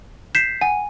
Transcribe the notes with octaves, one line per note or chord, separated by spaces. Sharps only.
G6 B6 C7 E7
F#5 G#5